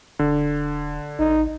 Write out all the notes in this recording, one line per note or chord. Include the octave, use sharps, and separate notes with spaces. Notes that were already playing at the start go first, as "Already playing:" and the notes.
D#1 D3
A1 D#4